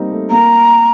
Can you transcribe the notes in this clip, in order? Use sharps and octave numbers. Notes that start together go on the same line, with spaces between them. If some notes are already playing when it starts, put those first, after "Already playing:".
Already playing: G3 A#3 C4 D#4
A3
A#3 A#5